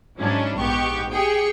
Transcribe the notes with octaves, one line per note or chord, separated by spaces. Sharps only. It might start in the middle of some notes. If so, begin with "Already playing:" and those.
G#2 F#3 C#4 D4 E4
A#1 G#2 B3 G4 C#6 G6
G4 G#4 G5 G#5 C#7